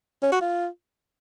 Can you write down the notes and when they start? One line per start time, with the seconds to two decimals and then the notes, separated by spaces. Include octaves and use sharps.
0.23 C#4
0.32 F#4
0.41 F4